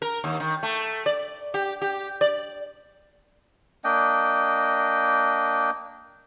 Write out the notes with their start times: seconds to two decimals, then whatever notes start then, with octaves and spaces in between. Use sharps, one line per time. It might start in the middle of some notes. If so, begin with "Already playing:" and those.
0.02 A#4
0.24 D#2
0.40 D#3
0.63 A3
1.06 D5
1.54 G4
1.82 G4
2.21 D5
3.84 A#3 D4 D#5 G5